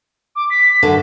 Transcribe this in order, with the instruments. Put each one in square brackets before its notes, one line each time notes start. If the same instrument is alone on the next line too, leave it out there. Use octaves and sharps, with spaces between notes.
[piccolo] D6
B6
[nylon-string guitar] F#2 D3